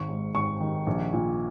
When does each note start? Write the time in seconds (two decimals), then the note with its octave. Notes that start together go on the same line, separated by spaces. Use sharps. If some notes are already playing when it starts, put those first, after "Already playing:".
Already playing: G#1 C#6
0.09 G#2
0.35 G#1 C#6
0.61 D#3
0.87 A#1
1.13 A#2